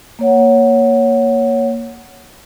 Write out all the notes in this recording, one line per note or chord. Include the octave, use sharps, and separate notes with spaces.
A#3 C#5 F#5